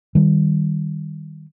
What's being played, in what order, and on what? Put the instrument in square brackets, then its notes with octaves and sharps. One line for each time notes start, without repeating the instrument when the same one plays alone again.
[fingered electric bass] D#3 G3